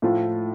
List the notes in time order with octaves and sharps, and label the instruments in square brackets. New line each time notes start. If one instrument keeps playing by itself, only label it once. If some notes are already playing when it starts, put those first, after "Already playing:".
[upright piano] A2 F3 A3 F4